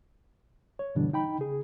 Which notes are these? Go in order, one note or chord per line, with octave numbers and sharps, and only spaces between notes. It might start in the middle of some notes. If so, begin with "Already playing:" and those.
C#5
G2 B2 D3 E3 G3 D4
D#4 G5 B5
C#3 G#4